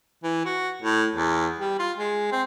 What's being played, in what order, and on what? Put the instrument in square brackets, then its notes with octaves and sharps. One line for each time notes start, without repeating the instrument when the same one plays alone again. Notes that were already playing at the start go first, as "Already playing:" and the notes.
[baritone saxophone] E3
F#4
A2
E2
G3
F4
G#3
C4